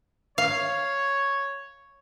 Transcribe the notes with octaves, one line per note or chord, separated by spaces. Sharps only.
C#5 F5